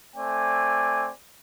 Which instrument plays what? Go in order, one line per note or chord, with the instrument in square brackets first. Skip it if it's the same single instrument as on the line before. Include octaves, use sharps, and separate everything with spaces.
[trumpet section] A3 C4 D5 G#5